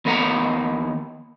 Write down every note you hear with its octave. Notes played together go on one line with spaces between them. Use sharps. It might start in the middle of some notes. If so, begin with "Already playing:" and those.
D#2 B3 A#4 F5 F#5 A#5